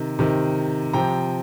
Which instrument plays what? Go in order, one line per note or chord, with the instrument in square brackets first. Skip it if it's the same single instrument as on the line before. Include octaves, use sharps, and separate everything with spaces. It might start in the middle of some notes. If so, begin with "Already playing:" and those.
Already playing: [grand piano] C3 D#3
C3 D#3
C3 F3 G5 A#5